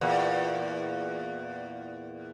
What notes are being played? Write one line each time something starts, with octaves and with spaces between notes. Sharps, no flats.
E2 A#2